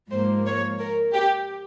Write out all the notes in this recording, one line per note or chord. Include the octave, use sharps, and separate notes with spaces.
G#2 F3 A#3 C5
C#5
A#4
G4